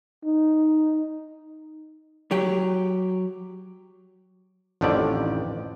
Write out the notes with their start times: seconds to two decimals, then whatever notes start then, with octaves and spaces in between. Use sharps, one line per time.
0.24 D#4
2.31 F#3 G4
4.81 A1 F2 D3 D#3 G4 D5